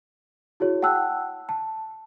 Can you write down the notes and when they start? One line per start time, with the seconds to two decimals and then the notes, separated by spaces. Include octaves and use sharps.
0.60 E4 F#4 G#4 C#5
0.82 F#5 G5 A5 E6 F#6
1.49 A5